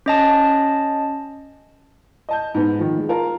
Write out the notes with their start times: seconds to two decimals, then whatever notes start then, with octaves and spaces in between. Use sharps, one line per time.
0.06 C#4 D#5 A5
2.29 D#5 A5 G6
2.55 G#2 B3
2.79 D#3 F3
2.98 G#3
3.09 F4 A#4 F5 A5